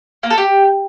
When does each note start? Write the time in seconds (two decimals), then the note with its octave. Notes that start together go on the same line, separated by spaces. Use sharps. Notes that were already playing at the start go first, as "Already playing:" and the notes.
0.23 A#3
0.30 A4
0.38 G4